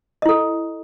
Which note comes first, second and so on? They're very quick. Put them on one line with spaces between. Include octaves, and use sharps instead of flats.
D#5 E4 A4